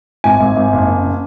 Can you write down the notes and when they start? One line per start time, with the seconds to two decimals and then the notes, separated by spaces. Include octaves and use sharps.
0.24 G#1 G#5
0.40 G#1
0.56 G#1
0.72 F#1
0.88 C#3
1.04 C#3